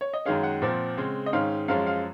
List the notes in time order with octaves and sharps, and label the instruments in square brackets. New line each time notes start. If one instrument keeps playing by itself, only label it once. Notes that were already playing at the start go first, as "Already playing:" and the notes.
[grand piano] C#5
D#5
F#2 D#3 G#3 C#4 F5
F#5
A#2 F3 C4
C#3 G#3 C4
D#5
G#2 D#3 G#3 C#4 F5
F#2 F3 G#3 C#4 F5
F5